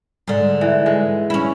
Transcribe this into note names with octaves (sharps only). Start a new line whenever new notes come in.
G#2 D3
E3
G#3
C#4 E4